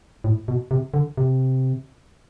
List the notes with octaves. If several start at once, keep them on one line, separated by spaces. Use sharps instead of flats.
A2
B2
C3
D3
C3